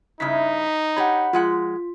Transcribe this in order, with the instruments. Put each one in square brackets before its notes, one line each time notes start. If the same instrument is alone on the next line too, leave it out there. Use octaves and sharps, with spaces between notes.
[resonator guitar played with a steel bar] G2 C#3 E4 [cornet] D#4 [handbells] B6
[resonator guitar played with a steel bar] G4 C#5 [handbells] F#5 B5
[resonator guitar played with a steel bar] F3 G#3 F#5 [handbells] F4